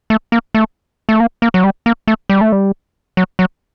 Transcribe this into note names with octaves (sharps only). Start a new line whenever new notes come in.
A3
A#3
A3
A3
A#3
A#3
F#3
G3
A#3
A3
G3
A3
G3
F#3
F#3